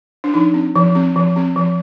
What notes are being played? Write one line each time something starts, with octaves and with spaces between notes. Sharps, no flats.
D4
F3 D#4
C4
F3
C4
F3
C4
F3